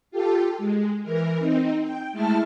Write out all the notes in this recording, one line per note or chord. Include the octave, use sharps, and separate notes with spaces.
F4 G4 A4
G#3
E3 A#4
C4 D#4
G5
G#3 A3 E4 A5 F6